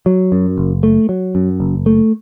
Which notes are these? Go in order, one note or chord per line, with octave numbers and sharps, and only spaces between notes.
F#3
F#2
F#1
A3
F#3
F#2
F#1
A3